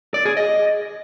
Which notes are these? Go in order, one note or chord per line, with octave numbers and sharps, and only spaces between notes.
D5
G#4
D#5